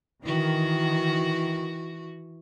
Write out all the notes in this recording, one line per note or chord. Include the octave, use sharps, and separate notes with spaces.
D#3 E3 F#4